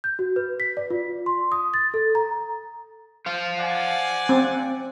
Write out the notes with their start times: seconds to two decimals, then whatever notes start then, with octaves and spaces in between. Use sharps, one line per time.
0.04 G6
0.19 F#4
0.36 B4
0.60 B6
0.77 D5
0.90 F4
1.26 C6
1.52 D#6
1.74 A6
1.94 A4
2.15 A#5
3.26 C5 F5
3.59 D5 F#5 G#5
4.29 C4